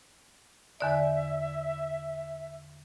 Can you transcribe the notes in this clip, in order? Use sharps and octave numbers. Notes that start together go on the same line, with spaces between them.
E2 D3 D5 E5